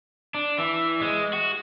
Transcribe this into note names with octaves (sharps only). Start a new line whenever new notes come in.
D4
E3
G#3
F#4